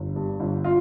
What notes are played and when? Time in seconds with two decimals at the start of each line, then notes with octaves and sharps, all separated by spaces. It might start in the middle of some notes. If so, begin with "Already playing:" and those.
Already playing: G1
0.16 G2
0.40 G1
0.64 F4